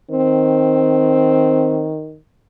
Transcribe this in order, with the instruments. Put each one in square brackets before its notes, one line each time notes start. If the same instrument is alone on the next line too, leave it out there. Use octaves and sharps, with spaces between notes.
[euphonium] D#3 [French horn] C4